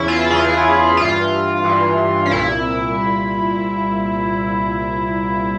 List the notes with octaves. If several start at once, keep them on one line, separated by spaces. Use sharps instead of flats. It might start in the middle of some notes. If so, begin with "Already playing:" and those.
Already playing: E2 C#3 E3 C#4 E4
F4
E2 C#3 E3 G#4
G2 E3 F4
G2 E3
C#4
C2 A#2 E4